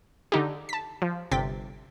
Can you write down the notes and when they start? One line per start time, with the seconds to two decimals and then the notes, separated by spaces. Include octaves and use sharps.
0.32 D3 D#4 G4
0.69 A5 B6
1.02 F3
1.31 G1 C3 G5 A6 B6